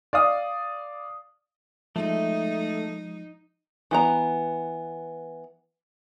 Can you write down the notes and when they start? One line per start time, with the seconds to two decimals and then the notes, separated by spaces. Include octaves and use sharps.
0.13 D5 F5 D#6
1.96 F3 G#3 A3 D#4
3.91 E3 B3 A#5